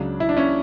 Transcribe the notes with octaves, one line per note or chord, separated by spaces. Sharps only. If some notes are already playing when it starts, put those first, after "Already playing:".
Already playing: C#2 C#3 F#3 D4
E4
D4
C#4 E4